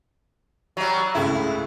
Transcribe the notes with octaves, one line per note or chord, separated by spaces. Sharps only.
F#3 G3
C#2 A2 C#3 E4